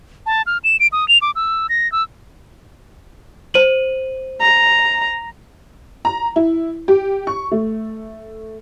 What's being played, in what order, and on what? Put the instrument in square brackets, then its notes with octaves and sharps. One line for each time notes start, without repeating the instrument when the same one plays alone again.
[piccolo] A5
F6
E7
D7
D#6
F7
D6
E6
A#6
E6
[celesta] C5 D#7 F#7
[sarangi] A#5
[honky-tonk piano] A#5
E4
G4
C#6
A3